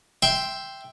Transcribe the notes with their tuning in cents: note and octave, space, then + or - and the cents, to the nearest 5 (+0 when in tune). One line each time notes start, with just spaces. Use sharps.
E5 +0 G5 +0 C6 +0